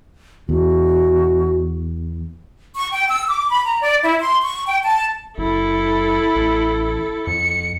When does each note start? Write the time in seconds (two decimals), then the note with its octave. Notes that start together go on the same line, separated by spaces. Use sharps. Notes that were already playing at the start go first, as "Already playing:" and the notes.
0.49 E2 F#4
2.77 C#6
2.92 G5
3.08 E6
3.28 D6
3.49 B5
3.65 A#5
3.81 D5
4.03 E4
4.20 C6
4.43 C#6
4.67 G5
4.83 A5
5.38 F#1 E4 A4
6.36 A1
7.27 F2 C#7